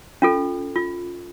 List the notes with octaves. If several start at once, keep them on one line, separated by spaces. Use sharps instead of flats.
C#4 F4 A4
F4